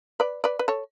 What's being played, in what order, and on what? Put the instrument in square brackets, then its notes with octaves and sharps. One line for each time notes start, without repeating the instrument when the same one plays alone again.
[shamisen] B4 D5
B4 D5
B4
A4 C#5